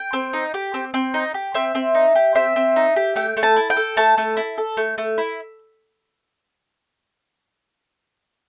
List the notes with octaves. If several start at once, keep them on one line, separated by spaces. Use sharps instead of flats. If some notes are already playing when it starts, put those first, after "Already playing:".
Already playing: G5
C4
D#4
G4
C4
C4
D#4
G4
C4 E5
C4
D#4
G4
C4 E5
C4
D#4
G4
A3 G5
A3
A5
E4
G5
A4
A3 A5
A3
E4
A4
A3
A3
E4